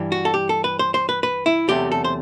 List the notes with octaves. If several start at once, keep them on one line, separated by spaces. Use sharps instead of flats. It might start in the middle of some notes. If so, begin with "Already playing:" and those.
Already playing: G2 E3 G3
F#4
A4
G4
A4
B4
C5
C5
B4
B4
E4
E2 C3 F#3 A3 G4
A4
C5